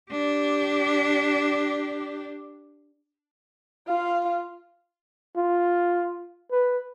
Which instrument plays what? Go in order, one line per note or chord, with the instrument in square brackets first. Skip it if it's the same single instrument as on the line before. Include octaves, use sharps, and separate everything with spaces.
[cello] D4 G4
[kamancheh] F4 F5
[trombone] F4
B4